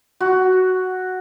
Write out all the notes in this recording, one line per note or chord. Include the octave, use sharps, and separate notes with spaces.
F#4